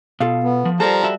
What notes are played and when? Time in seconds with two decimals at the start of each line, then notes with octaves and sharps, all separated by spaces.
0.20 B2 F4 A4 F5
0.44 B3
0.65 F3
0.80 F3 G3 A4 A#4 C5 A#5
1.04 F#4 E5